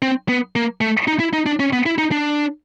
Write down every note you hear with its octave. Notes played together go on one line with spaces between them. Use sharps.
C4
B3
A#3
A3
D#4
E4
D#4
D4
C#4
B3
E4
D#4
D4